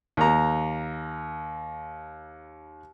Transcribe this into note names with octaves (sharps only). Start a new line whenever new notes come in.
D#2 A#5